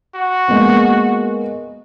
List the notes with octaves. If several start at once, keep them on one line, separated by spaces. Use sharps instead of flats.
F#4
G#3 A#3 B3